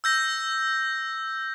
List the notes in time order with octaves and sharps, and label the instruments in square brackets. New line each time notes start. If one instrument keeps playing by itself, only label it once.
[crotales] E6 G6 A#6